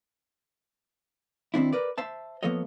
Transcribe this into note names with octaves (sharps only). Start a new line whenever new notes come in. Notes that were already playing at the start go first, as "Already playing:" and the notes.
D#3 C4 D4 E4
A#4 B4 D5
C5 E5 A5
F3 A#3 B3 A4 C#5 D#5